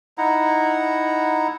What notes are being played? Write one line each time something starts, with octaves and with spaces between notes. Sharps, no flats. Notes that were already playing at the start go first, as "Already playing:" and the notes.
D#4 E4 F#5 A#5